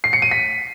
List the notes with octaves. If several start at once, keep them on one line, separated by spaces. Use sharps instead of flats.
C7
C#7
D#7
B6